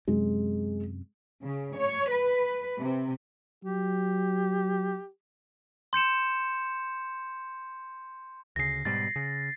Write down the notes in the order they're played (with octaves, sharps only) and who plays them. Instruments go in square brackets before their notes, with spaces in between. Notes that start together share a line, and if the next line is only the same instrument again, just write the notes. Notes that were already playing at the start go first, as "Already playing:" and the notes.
[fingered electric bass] F#2 C3 [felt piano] G#3
[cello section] C#3
C#5
B4
C3
[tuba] F#3 [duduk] G4
[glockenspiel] C6 G6 C#7 E7
[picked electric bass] D2 C#3 [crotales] A#6 C7
[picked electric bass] G#2 B2 G3 [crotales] A6
[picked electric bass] C#3